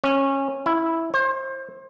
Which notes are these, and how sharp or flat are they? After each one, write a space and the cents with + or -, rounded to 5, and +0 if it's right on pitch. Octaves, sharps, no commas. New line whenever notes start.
C#4 -20
E4 -5
C5 +30